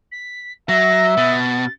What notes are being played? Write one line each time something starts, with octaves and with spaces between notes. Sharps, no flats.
B6
F#3 E5 A#6
B2 A6